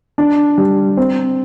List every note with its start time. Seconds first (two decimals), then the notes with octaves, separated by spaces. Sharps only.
0.18 D4
0.58 G3
0.97 C4